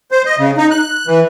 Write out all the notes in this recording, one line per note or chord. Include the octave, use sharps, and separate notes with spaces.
C5
D#5
C#3
D#4
F#6
E3